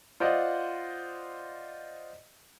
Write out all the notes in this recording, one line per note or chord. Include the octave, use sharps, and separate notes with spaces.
F4 C5 D5 D#5 F#5